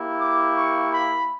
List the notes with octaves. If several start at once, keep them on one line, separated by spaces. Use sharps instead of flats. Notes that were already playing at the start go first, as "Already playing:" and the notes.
Already playing: A#3 E4 G4
D6
C#6
B5